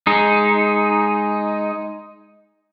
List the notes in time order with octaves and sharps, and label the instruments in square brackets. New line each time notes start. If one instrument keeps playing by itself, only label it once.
[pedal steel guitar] G#3 D#4